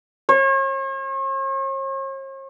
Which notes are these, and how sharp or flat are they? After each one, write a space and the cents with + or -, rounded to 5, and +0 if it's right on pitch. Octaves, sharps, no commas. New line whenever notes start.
C#5 -45